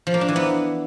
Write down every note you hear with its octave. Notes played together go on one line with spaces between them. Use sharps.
F3
A#3
D4
E3
B3